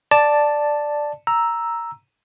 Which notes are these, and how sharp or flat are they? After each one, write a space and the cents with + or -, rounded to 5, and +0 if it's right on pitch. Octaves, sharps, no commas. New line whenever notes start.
D5 +5 A5 +0
A#5 +0 E6 +0